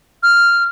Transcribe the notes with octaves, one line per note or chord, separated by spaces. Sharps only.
F6